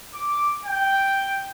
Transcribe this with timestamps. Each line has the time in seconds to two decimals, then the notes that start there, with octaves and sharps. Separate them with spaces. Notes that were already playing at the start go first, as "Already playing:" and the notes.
0.14 D6
0.65 G5